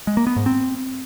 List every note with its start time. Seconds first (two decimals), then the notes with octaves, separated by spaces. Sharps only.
0.07 G#3
0.17 A#3
0.27 B3
0.36 G#2
0.46 C4